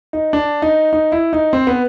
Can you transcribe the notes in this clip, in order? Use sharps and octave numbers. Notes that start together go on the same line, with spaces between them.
D#4
D4
D#4
D#4
E4
D#4
C4
B3